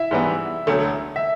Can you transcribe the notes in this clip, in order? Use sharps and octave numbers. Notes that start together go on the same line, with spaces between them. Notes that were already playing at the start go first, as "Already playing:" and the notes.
Already playing: E4 E5
G#2 E3 G3 B3
E1 D2 D3 F#3 A3
E5